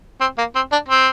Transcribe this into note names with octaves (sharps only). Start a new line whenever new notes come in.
C4
A#3
C4
D4
C4